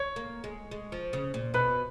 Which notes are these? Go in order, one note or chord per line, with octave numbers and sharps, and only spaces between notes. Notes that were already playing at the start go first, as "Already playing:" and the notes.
Already playing: C#5
A#3
G#3
G#3
F3
C#3
A#2
B2 B4